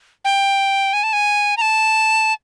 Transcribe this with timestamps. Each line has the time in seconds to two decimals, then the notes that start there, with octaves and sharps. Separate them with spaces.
0.25 G5
0.93 G#5
1.03 A5
1.13 G#5
1.57 A#5
1.61 A5